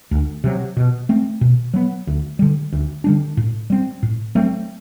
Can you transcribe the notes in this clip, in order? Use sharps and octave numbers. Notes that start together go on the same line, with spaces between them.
D2
C3 F#3
B2
A3 C4
B2
F#3 B3
D2
D3 G3
D2
D3 G3 D4
A2
G3 C4
A2
F#3 A3 C4